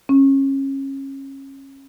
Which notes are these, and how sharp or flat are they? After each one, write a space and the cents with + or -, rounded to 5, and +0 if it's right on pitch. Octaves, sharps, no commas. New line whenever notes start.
C#4 -25